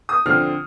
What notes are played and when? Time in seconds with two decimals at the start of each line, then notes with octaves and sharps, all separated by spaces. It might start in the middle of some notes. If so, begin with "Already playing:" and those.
0.09 D#6
0.26 D3 F3 C4 F6